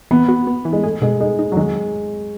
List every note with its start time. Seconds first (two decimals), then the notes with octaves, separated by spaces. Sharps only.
0.11 E3 B3
0.28 F#4
0.47 B3
0.65 E3
0.73 G#3
0.83 A3 G#4
1.02 B2 G#3
1.20 G#3 D#4
1.39 D#4
1.52 F#3
1.57 D#3 G#3